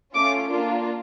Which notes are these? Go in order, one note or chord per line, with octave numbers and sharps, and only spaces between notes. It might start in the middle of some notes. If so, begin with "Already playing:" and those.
A3 C#4 F4 D6
A#3 D4 F4